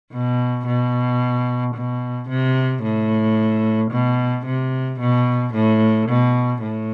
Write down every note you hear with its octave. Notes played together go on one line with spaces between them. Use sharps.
B2
B2
B2
C3
A2
B2
C3
B2
A2
B2
A2